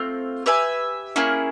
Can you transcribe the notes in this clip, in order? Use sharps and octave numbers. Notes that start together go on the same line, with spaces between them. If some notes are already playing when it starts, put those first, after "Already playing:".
Already playing: A3 C4 F4
G4 B4 E5 G#5
A#3 C#4 E4 G#4